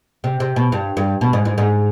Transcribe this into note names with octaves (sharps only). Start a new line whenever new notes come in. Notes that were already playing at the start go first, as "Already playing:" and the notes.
C3
C3
B2
G2
G2
B2
G#2
G#2
G#2